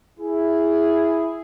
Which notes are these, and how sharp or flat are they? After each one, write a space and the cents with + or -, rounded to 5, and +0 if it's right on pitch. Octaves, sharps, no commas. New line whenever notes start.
E4 +0 G#4 +0